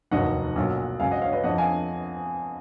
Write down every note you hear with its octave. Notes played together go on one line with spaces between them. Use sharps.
F1 D#2 D#3 F#3 D#5 F#5
B1 A#2 F#3
C#2 C#3 F#3 F5 G#5
D#5 F#5
C#5 F5
B4 D#5
F2 F3 D#5 F#5
F5 G#5